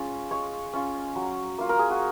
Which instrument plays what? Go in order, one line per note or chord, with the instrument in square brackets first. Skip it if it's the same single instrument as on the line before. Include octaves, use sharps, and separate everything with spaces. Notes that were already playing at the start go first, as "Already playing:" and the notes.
Already playing: [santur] G#3 C#4 F4
G#3 C#5
C#4 F4
F#3
A#3 F4
A#4
G#4
F#4